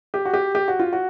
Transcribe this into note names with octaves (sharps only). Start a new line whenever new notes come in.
G4
F#4
G4
G4
F#4
F4
F#4